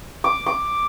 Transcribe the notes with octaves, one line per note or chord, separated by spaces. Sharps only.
D6
D6